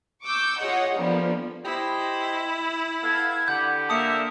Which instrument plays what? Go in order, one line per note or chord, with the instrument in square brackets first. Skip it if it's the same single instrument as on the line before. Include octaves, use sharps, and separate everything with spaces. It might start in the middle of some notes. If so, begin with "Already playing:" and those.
[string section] C#6 D6 E6 G6
F4 G#4 C#5 D#5 F#5
D3 F3 G3 A#3 B3
[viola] E4 [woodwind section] G4 C5 D#5
[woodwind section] B3 A4 F5 [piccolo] G#6
[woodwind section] D3 G4 [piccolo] F#5 [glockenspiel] G6
[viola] A#3 [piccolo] E5 [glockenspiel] A5 D#6 C#7